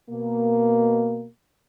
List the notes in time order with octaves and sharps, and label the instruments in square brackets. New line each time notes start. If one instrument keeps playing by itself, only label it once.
[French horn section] B2 A#3